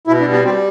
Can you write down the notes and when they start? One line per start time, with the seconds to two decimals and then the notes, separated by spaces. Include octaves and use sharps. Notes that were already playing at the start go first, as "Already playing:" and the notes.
0.07 B2 E4
0.21 D4
0.27 G3
0.32 B3
0.45 G3 C4